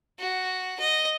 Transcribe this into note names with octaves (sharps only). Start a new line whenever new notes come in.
F#4
D#5